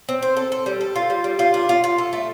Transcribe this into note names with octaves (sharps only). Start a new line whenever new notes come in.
C4
C5
A4
A4
G3
A4
F4
G3
G3
F4
D4
F4
F4
A4
A3